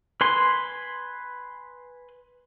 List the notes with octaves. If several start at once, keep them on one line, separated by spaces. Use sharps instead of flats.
B4 G#5 C6